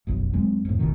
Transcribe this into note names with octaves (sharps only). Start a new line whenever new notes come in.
F1 B1 F#2
E2 F#3 G#3 C4
F2 A2
D1 A1 B2 D#3